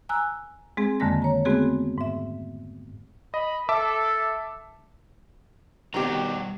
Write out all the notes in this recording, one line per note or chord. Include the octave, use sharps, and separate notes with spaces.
G#5 A#5 E6 F#6
G#3 C4 G#4
F2 D3 D#3 G#3 A#3 A#6
C#5 A#5
G#3 A3 B3 C4 F#4 G#4
G#2 E5
D#5 B5
A4 E5 A5 D6
B2 D#3 G3 C4 F#4 G4 A#5